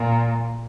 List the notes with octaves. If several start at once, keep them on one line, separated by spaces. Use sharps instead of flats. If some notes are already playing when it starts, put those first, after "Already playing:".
Already playing: A#2